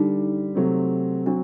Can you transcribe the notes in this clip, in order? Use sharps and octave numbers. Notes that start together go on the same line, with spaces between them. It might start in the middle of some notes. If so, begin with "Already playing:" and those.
Already playing: D3 G3 D4 D#4
C3 F#3 A3 C4
F#3 C4 D4 F#4